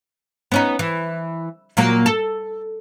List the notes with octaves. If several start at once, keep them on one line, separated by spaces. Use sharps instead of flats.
B3 C#4 D#4
E3
A#2 F#3 A#3
A4